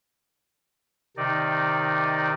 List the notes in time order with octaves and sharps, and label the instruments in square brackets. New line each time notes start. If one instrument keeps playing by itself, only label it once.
[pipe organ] C3 D#3 D#4 D5